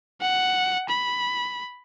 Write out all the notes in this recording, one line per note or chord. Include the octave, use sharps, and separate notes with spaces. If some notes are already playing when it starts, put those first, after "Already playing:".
F#5
B5